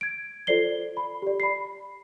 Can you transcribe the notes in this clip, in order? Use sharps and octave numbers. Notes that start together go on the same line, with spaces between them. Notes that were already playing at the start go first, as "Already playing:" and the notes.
G#6 D7
F4 A4 C5 D5 C7 G7
B5
G4 D5
B5 C7